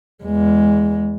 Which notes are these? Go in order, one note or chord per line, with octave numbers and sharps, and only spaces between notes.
E2 G#3